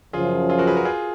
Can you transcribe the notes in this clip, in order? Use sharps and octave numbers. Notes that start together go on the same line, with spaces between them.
F#2 C#3 F3 F4 G#4
F4 G#4
F#4 A#4
G#4 B4
F#4 A#4
F4 G#4